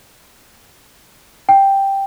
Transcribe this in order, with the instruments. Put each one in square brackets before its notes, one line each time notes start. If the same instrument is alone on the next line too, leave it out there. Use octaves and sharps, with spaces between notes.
[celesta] G5